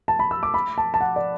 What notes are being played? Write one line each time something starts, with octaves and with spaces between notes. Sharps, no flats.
A5
B5
E6
D6
B5
A5
A5
F#5
D5